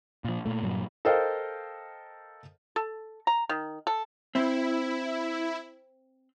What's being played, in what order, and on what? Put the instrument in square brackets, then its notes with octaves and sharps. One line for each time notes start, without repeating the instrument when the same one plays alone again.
[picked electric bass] A#2 F3
A#2 A3
G2 A#2 F#3
[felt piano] A4 A#4 C5 D#5 F5 G5
[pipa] A4
A#5
D#3
A4
[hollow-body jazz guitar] C4 [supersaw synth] E4